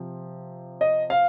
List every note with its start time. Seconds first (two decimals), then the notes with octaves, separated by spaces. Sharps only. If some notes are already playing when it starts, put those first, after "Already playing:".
Already playing: C3 F3
0.81 D#5
1.10 F5